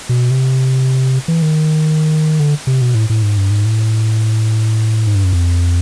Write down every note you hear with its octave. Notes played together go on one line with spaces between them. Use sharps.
B2
C3
E3
D#3
D3
C3
B2
A2
A2
G#2
G2
G#2
A2
G#2
G2
F#2
F2